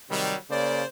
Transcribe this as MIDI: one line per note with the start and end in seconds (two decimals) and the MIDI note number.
0.10 0.35 48
0.10 0.35 51
0.10 0.35 54
0.10 0.35 55
0.51 0.85 49
0.51 0.85 58
0.51 0.85 72
0.51 0.85 74